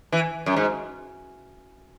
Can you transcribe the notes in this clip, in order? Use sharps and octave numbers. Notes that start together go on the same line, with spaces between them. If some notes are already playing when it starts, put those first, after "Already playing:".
E3
F#2
G#2